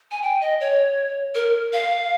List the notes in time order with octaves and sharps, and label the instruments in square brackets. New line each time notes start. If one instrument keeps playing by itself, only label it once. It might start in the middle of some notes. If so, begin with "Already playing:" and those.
[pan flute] G#5
G5
D#5
C#5
A#4
F5